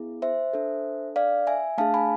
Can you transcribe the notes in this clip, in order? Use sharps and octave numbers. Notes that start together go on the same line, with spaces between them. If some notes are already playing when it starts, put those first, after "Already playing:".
Already playing: B3 E4 G#4
C5 E5
D4 A4
D5 F5
E5 G#5
A3 D4 G#4 F5 A5
G#5 B5